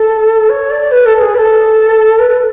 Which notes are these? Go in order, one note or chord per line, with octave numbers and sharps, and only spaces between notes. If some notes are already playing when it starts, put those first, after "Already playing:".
Already playing: A4
C#5
D5
B4
A4
G#4
B4
A4
B4